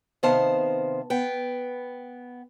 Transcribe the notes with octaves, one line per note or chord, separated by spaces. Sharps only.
C3 D#3 B3 C5 F5 A5
B3 G5